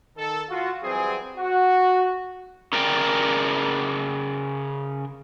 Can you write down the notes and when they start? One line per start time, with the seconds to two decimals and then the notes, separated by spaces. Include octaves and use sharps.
0.17 D#3 A4
0.49 F4 F#4
0.82 E3 F#3 G3 C4 G#4
1.37 F#4
2.73 C#3 A#4 D5 G5